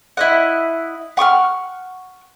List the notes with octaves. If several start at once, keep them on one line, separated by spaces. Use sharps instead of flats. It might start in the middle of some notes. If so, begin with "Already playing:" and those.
E4 D#5 F#5
F#5 C#6 D6 F6